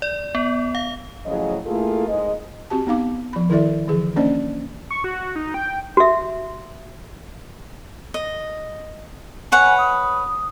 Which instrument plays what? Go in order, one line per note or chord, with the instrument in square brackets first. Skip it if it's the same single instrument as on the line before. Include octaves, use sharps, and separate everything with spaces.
[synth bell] D5
B3
F5
[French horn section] A2 C#3 F3 F#3 G#4 D#5
A3 A#3 E4 F4 G#4 A4
G#2 G#3 D#5
[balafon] C4 F#4 G4 A5
B3 D#4 F5 D6
F3 B5
D#3 E4 A4 D5 E5
D3 E3 F3 G#4
A#3 C#4 D4 C5 D5 D#5
[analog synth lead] C#6
F#4
D#4
G5
[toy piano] F#4 E5
[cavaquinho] D#5
[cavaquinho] B4 C#5 F#5 [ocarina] G#5
[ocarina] D#6